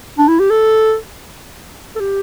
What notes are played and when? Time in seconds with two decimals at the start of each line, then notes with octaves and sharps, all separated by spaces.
0.18 D4
0.28 E4
0.39 G4
0.50 A4
1.96 A4
2.00 G4